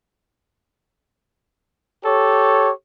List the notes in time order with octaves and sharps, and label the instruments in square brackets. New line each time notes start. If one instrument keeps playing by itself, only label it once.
[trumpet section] G4 A4 C#5